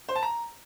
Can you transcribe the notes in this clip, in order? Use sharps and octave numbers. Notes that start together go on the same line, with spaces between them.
C5
A5
A#5